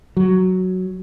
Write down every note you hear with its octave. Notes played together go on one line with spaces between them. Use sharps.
F#3